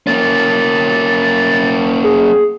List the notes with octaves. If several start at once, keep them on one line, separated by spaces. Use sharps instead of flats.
A#3 C#4 A6
G#4